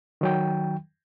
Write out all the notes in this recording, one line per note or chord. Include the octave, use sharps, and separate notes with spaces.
D#3 F#3 G5